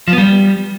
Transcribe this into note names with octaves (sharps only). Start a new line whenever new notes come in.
F3
B3
G3